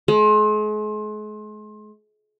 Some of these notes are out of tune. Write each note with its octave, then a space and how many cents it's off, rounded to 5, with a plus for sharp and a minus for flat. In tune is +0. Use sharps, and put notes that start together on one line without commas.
G#3 +40